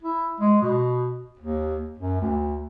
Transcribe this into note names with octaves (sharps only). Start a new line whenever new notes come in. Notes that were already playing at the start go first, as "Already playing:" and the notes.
E4
G#3
B2
D#2
F#2
D2